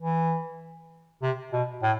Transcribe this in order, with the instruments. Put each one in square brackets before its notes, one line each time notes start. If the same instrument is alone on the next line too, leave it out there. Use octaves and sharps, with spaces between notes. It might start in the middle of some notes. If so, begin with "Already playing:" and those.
[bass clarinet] E3
C3
B2
A2